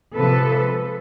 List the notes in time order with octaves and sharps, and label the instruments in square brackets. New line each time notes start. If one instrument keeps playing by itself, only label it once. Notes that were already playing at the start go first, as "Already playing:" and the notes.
[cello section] C3 F3 G#3 A4 B4